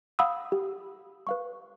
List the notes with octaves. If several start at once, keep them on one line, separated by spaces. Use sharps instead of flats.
F5 F#5 B5 D#6 E6
G4
B4 F5 C#6